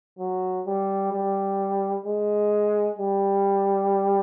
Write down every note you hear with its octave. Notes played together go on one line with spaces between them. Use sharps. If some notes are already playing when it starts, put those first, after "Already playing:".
F#3
G3
G3
G#3
G3